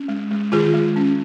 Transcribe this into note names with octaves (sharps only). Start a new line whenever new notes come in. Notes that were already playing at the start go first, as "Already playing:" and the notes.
Already playing: C#4
G#3
G#3
D#3 F4 G#4
G#3
C#4